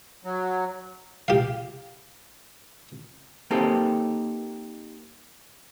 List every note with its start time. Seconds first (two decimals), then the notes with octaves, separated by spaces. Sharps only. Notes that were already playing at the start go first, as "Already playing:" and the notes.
0.24 F#3
1.28 G4 F5
3.51 A#3 C4 D#4 G4 A4